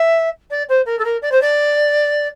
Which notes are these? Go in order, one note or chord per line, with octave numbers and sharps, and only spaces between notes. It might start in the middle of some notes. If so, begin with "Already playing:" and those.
Already playing: E5
D5
C5
A#4
A4
A#4
D5
C5
D5